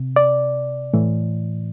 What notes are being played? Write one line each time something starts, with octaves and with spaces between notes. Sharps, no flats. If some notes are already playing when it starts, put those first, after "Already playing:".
Already playing: C3
D5
A2 E3